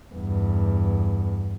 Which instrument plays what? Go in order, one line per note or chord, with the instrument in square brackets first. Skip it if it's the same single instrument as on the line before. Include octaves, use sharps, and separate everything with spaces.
[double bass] E2 G2